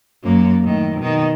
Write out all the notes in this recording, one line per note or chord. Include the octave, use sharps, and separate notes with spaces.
F#2 A#3
A2 D#3
B2 D#3